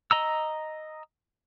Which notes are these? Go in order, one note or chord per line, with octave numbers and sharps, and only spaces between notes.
D#5 A#5 E6